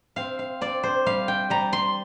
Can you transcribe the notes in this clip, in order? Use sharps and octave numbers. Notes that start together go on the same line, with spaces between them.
C4 F5
F5
C4 D5
C5
G3 F5
G5
G3 A#5
C6